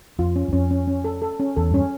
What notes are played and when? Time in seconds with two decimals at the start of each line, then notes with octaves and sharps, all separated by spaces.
0.19 F2 F4
0.36 C#4
0.48 F#2
0.53 F2 C#4
0.71 C#4
0.87 C#4
1.04 A4
1.22 A4
1.39 C#4
1.56 E2 A4
1.71 G2 C#4